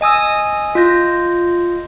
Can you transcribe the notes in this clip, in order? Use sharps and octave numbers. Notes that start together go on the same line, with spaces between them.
D#5 G#5 D#6 E6
F4 D#5 G6 A#6